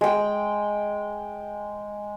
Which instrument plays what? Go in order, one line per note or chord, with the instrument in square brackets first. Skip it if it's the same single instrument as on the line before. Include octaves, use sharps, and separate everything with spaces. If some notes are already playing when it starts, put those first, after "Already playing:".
[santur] G#3 G5